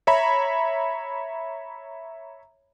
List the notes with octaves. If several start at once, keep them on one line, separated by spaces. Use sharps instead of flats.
C#5 E5 A#5 B5